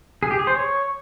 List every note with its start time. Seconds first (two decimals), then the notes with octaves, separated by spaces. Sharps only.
0.23 G#4
0.31 G4
0.39 G#4
0.47 C5
0.55 C#5